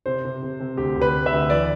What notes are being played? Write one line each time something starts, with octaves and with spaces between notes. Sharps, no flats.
C3 C5
C3
C3
C3
D2 G4
D2
B4
D2
E5
D2
E3 D5